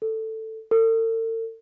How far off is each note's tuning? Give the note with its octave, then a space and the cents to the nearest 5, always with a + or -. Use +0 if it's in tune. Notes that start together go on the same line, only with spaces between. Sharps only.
A4 +10
A4 +45